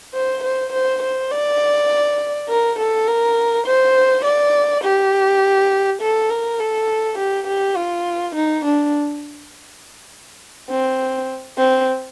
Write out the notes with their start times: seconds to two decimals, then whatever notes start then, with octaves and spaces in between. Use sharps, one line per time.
0.14 C5
0.43 C5
0.73 C5
1.03 C5
1.31 D5
2.49 A#4
2.79 A4
3.07 A#4
3.66 C5
4.25 D5
4.84 G4
6.01 A4
6.30 A#4
6.60 A4
7.18 G4
7.47 G4
7.76 F4
8.35 D#4
8.65 D4
10.70 C4
11.58 C4